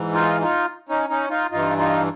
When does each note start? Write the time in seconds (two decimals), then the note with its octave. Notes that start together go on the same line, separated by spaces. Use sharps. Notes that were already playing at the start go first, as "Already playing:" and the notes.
Already playing: G#2 E3
0.13 D#4 F4
0.41 D#4 F4
0.89 C#4 D#4
1.09 C#4 D#4
1.30 D#4 F4
1.51 G2 E3 D#4 F4
1.78 D#4 F4